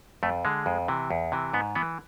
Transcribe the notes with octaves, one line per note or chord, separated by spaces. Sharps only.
F2 A3
D3 G#3
F2
C3 E3
E2
C3 E3
G#2 B3
E3 B3